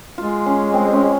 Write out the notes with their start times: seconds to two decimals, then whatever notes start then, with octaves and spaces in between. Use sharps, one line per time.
0.18 G#3 F4
0.46 C#4
0.74 C4
0.93 C#4